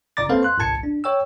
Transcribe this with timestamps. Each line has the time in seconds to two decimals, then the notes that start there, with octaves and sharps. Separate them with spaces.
0.17 G1 C#3 D5 A#5 D6 A6
0.29 A#3 C4 A4 B4 C5 F5
0.43 C6 F#6
0.58 G1 C2 A#2 A5 G#6 C#7
0.83 D4
1.04 C#5 G5 E6